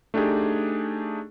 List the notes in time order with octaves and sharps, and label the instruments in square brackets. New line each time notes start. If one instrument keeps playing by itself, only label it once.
[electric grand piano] A3 D4 D#4 G4 G#4